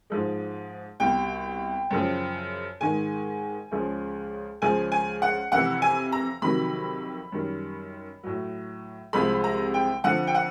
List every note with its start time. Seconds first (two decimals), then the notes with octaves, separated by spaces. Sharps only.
0.10 G#2 F3 G#3
1.00 C2 B2 G3 G5
1.91 F#2 C#3 F3
2.80 G#2 D#3 G#3 G#5
3.71 C#2 C#3 F3 G#3
4.62 C#2 C#3 F3 G#3 G#5
4.92 G#5
5.22 F#5
5.52 F2 C3 E3 F#5
5.82 G#5
6.12 A#5
6.42 F2 C3 D#3 F#3 B5
7.32 F#2 D#3 G3
8.23 A2 F#3
9.13 C2 C3 F3 G#3 B5
9.44 A#5
9.74 G5
10.04 F2 D3 F3 F#5
10.27 G5
10.35 F#5